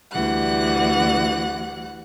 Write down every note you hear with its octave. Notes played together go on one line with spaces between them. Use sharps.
D2 E3 G3 F#5 F#6